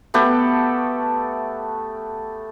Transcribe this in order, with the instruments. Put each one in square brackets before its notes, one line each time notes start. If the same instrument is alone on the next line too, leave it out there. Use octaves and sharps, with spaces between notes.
[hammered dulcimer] A3 B3 G4 A4